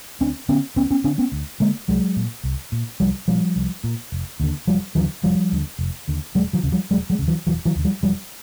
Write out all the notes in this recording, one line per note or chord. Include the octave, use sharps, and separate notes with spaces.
D2 C4 D4
D3 B3 C#4
D2 B3 C#4
B3 C#4
D3 C4 D4
B3 C#4
D2
D3 G#3 A#3
C2 F#3 G#3
A#2
C2
A#2
C2 F3 G3
A#2 F3 G3
C2
A#2
F1
D#2 D3
F1 F3 G3
D#2 D3 E3 F#3
F1 F3 G3
D#2 D3
F1
D#2 D3
E1 F#3 G#3
E3 F#3
D#2 C#3
F3 G3
E1 F#3 G#3
F#3 G#3
D#2 C#3
E3 F#3
E1 E3 F#3
E3 F#3
D#2 C#3
F3 G3
E1 F3 G3